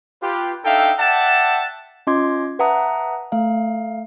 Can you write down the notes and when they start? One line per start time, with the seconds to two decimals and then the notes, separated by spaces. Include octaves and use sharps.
0.23 F4 G4 B4
0.65 D4 D#4 A4 E5 F5 G5
0.98 D5 E5 F#5 G5 A5
2.07 C#4 F4 D#5 C6 D6 G#6
2.59 B4 E5 F#5 A5 A#5 D#6
3.32 A3 F5